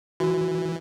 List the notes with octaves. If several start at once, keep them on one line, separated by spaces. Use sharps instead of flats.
E3 F#4